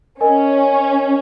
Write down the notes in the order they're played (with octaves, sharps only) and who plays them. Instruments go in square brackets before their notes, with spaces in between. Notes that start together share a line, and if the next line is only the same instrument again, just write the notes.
[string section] C#4 [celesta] A#4 D#5 G#5